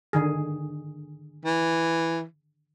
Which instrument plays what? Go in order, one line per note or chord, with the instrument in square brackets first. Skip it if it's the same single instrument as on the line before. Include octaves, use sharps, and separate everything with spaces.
[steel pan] D3 D#3 G#4
[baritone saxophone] E3